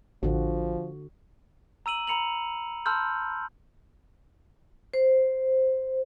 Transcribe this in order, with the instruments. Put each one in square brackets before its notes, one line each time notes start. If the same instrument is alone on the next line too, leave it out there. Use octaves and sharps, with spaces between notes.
[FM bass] A1 [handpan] D3 F#4 [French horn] F3
[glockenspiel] A#5 E6 D#7 F#7
A#5 B5 C#7 F7 F#7
A5 B5 C6 E6 F6 G6
[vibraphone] C5